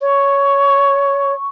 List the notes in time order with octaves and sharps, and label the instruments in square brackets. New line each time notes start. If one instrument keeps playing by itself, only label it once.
[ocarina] C#5 [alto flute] C#6